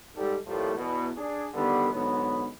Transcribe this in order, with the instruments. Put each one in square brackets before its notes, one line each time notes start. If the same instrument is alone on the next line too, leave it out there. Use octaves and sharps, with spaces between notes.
[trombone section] G#2 G3 A4
A2 F3 G3 A3 A#3
E2 B2
D4 G#4
D3 D#3 G3 B3
G#2 D3 F#3 B3